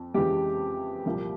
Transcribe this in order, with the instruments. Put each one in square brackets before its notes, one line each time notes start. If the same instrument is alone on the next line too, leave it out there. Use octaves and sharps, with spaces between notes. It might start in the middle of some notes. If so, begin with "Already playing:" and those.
Already playing: [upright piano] F2
[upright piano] F2 C#3 E3 G#3 [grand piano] G4
[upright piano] C2 A#2 F3 A#3